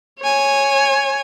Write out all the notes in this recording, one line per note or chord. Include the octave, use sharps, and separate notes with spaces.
C#5 G#5